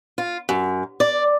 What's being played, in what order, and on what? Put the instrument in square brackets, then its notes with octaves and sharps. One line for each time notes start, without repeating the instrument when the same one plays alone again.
[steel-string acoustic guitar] F4
F#2
D5